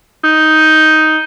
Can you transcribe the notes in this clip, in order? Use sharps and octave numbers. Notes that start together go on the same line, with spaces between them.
D#4